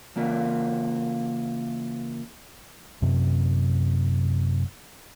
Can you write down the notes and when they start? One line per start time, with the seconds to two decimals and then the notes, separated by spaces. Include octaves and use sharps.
0.16 C#3 E3 A#3 F4 D5
3.02 F#2 C3